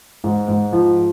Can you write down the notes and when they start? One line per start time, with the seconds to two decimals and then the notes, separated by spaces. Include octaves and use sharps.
0.24 G#2
0.48 G#2
0.73 F3